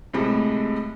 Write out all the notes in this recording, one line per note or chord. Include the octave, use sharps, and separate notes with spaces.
A2 C3 G3 G#3